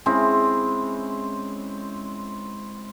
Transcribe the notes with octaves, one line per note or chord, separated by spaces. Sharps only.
G#3 C4 C#4 E4